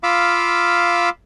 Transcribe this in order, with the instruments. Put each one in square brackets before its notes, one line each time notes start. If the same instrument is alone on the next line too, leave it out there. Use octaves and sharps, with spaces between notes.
[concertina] F4 F5 B5 D6 E6